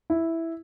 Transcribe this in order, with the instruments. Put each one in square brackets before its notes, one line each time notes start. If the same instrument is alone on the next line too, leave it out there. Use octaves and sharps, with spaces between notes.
[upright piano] E4